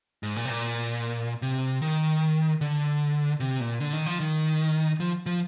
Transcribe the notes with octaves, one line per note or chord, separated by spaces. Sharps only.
G#2
A#2
C3
A#2
C3
D#3
D3
C3
A#2
D3
D#3
F3
D#3
F3
F3